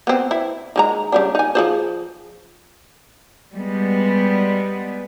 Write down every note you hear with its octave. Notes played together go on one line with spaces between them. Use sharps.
B3 C4
E4
D#3 G#3 A#5
C#3 G3 D4
D#4 G#5
F3 G#4 C5
G3 G#3 B3